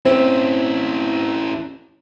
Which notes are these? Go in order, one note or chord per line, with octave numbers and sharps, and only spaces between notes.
C4 C#4 E4